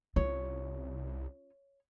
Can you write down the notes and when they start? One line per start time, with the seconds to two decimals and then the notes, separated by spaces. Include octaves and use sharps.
0.16 C2 C#4 F4 C#5